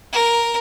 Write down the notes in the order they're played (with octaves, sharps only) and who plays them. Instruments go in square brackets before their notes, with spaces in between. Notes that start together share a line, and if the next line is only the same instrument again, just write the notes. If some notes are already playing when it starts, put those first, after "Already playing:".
[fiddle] A#4